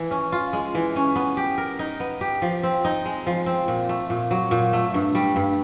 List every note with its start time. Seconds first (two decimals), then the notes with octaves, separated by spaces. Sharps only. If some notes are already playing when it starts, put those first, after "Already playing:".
Already playing: E3
0.11 C#4
0.32 F4
0.53 G#3
0.75 E3
0.96 C#4
1.16 B3
1.37 G4
1.58 A#4
1.79 D#4
2.00 B3
2.21 G4
2.42 F3
2.63 C4
2.85 D#4
3.06 G#3
3.27 F3
3.46 C4
3.68 A#2
3.89 A3
4.10 A#2
4.31 F#3
4.51 A#2
4.73 A3
4.94 G2
5.15 G3
5.36 G2